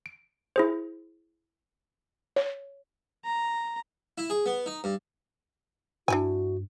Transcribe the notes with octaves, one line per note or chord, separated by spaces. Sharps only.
D7
E4 G#4 C5
C#5
A#5
E4
G#4
B3
D#4
G2
G2 D4 E4 F#4 G#5